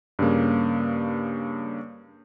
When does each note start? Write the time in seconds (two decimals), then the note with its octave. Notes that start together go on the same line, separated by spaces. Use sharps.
0.19 G2 C#3 A#3